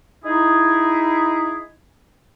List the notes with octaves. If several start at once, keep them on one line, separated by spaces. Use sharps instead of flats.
D#4 E4 G#4